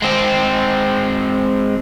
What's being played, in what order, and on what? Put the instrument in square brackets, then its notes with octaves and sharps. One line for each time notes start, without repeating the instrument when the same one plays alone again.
[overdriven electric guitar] G#3 C4